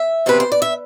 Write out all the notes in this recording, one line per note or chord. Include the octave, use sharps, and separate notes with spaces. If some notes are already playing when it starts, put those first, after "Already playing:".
Already playing: E5
E2 C3 F3 C4 B4
C5
D5
E5